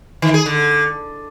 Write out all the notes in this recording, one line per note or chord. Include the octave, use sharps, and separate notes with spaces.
D#3
G#4
D3